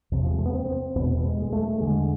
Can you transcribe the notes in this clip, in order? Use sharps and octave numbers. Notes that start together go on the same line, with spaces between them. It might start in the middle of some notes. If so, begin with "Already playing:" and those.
E2 C3
F3
G#3
A3
B3
C4
E2 B2 B3
G#3
G#3
A3
E2 D3 G#3